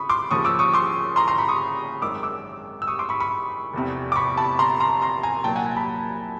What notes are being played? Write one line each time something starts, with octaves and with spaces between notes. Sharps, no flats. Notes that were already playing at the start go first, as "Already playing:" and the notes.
Already playing: F2 C#3 B5 C#6 D#6
C6 D6
D#2 C#3 F3 C#6 D#6
D6 E6
C#6 D#6
C6 D6
A#5 C6
A#5 C6
B5 C#6
C#6 D#6
G#1 F#2 D#3 G#3 D6 E6
D6 E6
E6
C#6 D#6
C6 D6
B5 C#6
B5 C#6
F1 E2 C3
D6
B5 C#6
A5 B5
A#5 C6
A#5 C6
A#5 C6
G#5 A#5
C2 A#2 F#3 G5 A5
F#5 G#5
G#5 A#5
A5 B5